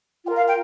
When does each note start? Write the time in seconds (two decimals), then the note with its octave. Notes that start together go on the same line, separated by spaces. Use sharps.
0.25 F4 A#4 G5
0.36 F5
0.46 G5